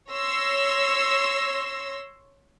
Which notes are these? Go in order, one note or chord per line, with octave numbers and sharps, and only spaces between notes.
C#5 C6 E6 A#6